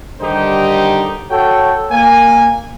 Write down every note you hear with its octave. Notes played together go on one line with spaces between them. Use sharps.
D3 D#3 G3 D#4 G4 C5
F#4 A4 C#5 G5
A#3 G#5